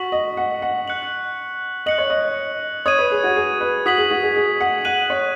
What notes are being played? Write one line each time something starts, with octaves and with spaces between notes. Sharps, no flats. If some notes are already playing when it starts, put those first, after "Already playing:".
Already playing: F#4 C#6 B6 F#7
D#5
F#5
F#5
F#6 C#7 F#7
D#5 F#6 C#7 F#7
C#5
D#5
C#5 D#6 G#6 D#7
B4
G#4
F#4
G#4
B4
F#4 D#6 B6 F#7
G#4
F#4
G#4
G#4
F#5
F#5 F#6 D#7 F#7
C#5